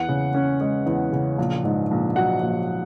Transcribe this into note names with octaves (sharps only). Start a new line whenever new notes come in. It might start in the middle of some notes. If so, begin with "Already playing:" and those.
Already playing: E2 F#5
C#3
C#4
G#3
E2
C#3
A#1
G#2
A#1
F#3 F#5
A#1